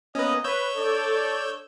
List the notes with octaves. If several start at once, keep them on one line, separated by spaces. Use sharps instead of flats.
A#3 B3 C#4 B4 D#5
B4 C#5 E6 G6
D4 A4 D5